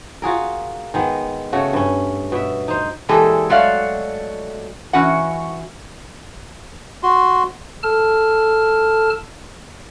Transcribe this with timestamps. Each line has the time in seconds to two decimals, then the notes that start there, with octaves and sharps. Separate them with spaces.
0.22 F4 F#4 G#4 A#4
0.94 D#3 G#3 B3
1.53 C#3 A3 F#4
1.73 G2 C#4
2.32 B2 E5
2.68 D#4 C5
3.09 A#2 E3 G#3 G4 A4
3.50 F#3 G#3 A3 F#4 D5 F5
4.93 E3 C#4 F#4 F#5
7.03 F#4 C6
7.83 A4 A5 F6